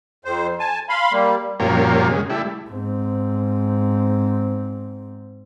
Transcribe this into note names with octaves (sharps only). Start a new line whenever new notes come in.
F2 C5
G#5 A5
F5 B5 C6
G3 A#3
F#2 A#2 F3 G3 A#3 C#4
C#3 G#3
G3 A3 E4
G#2 C4